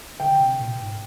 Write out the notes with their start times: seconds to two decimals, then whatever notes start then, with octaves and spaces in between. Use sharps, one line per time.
0.20 D3 G5
0.39 C3
0.59 A#2
0.79 G#2